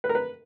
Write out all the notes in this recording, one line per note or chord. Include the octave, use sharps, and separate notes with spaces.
B4
A#4
B4